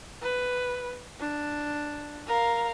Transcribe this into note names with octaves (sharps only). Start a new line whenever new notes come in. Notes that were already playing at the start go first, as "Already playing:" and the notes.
B4
D4
A#4 F5